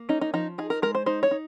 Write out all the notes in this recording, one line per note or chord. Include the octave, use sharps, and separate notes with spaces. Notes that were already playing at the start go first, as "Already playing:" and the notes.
Already playing: A#3
C#4 D#4
D#4
F3 D#4
D#4 G#4
A#4
G#3 A#4
C5
D#4 C5
C#5
D#4